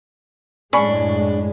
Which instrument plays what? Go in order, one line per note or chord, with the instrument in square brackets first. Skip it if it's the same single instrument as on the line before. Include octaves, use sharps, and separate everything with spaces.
[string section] F#2 A2 G#3 [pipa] C#4 B5 C#6 [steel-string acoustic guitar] D4